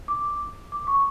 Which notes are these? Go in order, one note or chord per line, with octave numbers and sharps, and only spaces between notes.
D6
D6
D6
C#6